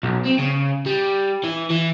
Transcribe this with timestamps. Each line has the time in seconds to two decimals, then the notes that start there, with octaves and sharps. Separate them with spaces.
0.03 B1
0.26 C4
0.39 C#3
0.86 G3
1.44 E3
1.71 E3